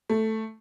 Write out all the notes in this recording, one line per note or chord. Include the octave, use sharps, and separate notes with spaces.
A3